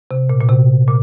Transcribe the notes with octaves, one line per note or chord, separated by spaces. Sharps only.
C3
A#2
A#2
C3
A#2